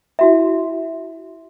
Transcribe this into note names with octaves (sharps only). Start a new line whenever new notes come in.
E4 F#4 E5